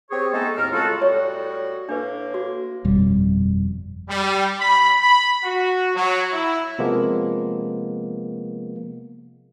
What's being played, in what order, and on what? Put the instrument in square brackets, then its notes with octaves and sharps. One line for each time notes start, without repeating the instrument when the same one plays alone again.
[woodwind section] C4 G4 G#4 C#5
G#3 A3 B3 D#4 A4
D#2 A2 C4 A#4 F6
C#3 G#3 F4 F#4 A4
[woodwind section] A2 G3 F#4 [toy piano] C#5
[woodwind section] A2 A#3 [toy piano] D4 B4
[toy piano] F#4
[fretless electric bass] G1 F2 B2 G3
[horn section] G3
B5
B5
F#4
F#3
E4
[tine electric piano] C3 F3 G#3 A#3 B3